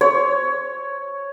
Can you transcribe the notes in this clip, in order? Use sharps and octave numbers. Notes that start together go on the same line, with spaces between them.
C#5